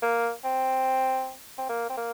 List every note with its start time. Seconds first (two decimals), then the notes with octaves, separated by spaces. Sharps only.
0.02 A#3
0.44 C4
1.58 C4
1.69 A#3
1.89 C4
1.98 A#3